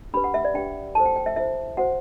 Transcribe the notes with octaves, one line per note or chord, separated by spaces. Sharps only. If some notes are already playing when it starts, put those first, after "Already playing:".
D4 G4 B4 B5
F#5
E5
D5
D4 G4 B4 G5
E4 A4 C5 A5
G5
G5
E5
E4 A4 C5 E5
F#4 C5 F#5